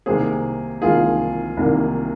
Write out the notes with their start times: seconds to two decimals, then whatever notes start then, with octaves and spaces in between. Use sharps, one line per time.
0.06 C2 C3 D#3 A#3 G#4 C5
0.82 C2 C3 D#3 A#3 F4 G#4
1.57 C2 C3 D#3 A#3